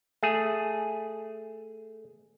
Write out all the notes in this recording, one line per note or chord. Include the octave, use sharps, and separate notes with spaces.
A3 G#4